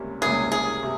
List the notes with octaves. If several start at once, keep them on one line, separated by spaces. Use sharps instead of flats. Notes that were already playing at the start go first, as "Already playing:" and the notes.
Already playing: C#2 C3 G3 A#3 C#4
C#2 C3 G3 A#3 C#4 G#4
G#4
C3